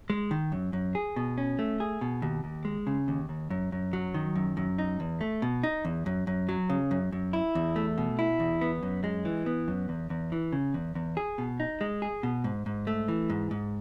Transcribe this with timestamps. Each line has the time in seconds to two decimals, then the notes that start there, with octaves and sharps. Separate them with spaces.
0.10 G#3
0.31 D#3
0.52 F#2
0.73 F#2
0.95 G#4
1.16 B2
1.38 C#4
1.59 A3
1.80 G#4
2.01 B2
2.22 D#2
2.44 D#2
2.65 G#3
2.87 C#3
3.08 D#2
3.29 D#2
3.50 F#2
3.72 F#2
3.93 F#3
4.14 D#3
4.35 F#2
4.57 F#2
4.78 D#4
5.00 E2
5.21 A3
5.42 B2
5.63 D#4
5.85 E2
6.06 F#2
6.27 F#2
6.49 F#3
6.70 C#3
6.91 F#2
7.12 F#2
7.33 E4
7.55 E2
7.76 A3
7.98 B2
8.19 E4
8.40 E2
8.61 B3
8.83 F#2
9.04 G#3
9.25 E3
9.46 B3
9.68 F#2
9.89 E2
10.10 E2
10.32 E3
10.53 C#3
10.74 E2
10.95 E2
11.17 G#4
11.38 B2
11.60 D#4
11.81 G#3
12.02 G#4
12.23 B2
12.44 G#2
12.66 G#2
12.87 A3
13.08 E3
13.30 G#2
13.51 G#2